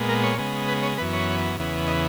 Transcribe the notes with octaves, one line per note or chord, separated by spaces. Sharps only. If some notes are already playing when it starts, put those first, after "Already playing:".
Already playing: A#2 G#3 B3
A#4
C#5
C#3 G#3 B3
B4
C#5
F#2 E3 B3 B4
C#5
E2 C#3 E3 B3
D#5